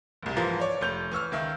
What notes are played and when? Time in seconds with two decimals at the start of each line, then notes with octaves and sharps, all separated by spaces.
0.22 F#1 C2
0.36 G#2 E3 F3 F4 A#4
0.60 C#5 D5
0.81 F1 G6 F7
1.12 E3 C#6 E6 F6
1.32 C#2 D#3 E5